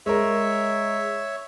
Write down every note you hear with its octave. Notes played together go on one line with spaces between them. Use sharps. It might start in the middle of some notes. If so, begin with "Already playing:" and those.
G#3 A#4 C#5 E5